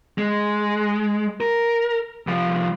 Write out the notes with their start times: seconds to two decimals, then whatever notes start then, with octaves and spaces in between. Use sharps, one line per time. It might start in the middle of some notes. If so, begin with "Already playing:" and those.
0.18 G#3
1.41 A#4
2.27 C2 F3